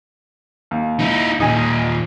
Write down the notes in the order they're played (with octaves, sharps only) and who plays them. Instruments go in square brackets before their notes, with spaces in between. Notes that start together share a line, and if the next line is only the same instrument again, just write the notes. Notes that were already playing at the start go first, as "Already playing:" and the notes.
[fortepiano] D#2
[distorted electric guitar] D#4 E4
[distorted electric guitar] D#2 A#2 [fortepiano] D#4 G#5